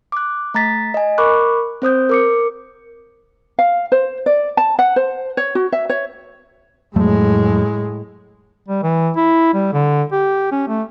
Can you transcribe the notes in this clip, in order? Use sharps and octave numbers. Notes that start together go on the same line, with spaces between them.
D6 F#6
A3 A#5 A6 B6
D#5 G#5
A#4 B5 C#6 D6 F#6
C4 C5 D#6 G6
A#4 D6 C#7
F5
C5
D5
A5
F#5
C5
C#5
F#4
E5
C#5
F2 A2 F#3 G#3 A3
G3
E3
E4
G3
D3
G4
C#4
A3